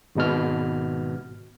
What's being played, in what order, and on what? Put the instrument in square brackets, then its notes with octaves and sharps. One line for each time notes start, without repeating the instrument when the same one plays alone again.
[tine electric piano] G#1 B2 F6